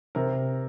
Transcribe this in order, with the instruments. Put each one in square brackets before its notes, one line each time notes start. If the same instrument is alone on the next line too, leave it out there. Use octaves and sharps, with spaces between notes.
[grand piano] C3 A#4